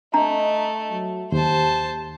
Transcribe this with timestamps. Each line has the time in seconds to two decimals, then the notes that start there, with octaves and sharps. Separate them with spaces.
0.14 A3 D4 D#5 A#5
0.90 F#3
1.32 D#2 G4 C5 A5